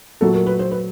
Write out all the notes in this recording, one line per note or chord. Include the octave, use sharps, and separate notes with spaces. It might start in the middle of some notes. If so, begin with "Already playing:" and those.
A#2 F#3 A3 A4
A#4
B4
C5
B4